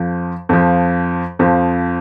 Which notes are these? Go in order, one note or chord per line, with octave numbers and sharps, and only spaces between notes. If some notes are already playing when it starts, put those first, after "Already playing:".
Already playing: F2 F3
F2 F3
F2 F3